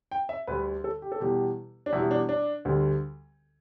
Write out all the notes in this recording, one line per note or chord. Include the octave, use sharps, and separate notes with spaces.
G5
E5
D2 D3 G3 B4
A4
G4
A4
E2 B2 G3 G4
D4
E2 B2 G3 E4
D4
D4
D2 D3 G3